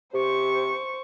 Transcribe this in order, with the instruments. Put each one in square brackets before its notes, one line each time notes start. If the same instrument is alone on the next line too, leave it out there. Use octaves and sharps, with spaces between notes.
[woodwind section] C3 G4 [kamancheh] C5 C#6